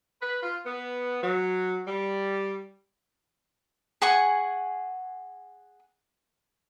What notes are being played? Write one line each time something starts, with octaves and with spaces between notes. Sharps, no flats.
B4
F4
B3
F#3
G3
G#4 F#5 G#5 C#6